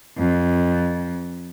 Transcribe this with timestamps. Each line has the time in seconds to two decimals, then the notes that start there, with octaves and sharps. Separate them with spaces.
0.16 F2